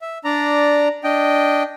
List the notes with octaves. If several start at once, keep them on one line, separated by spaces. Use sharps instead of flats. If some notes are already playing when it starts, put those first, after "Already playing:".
E5
D4 D5 A#5
D4 D#5 G5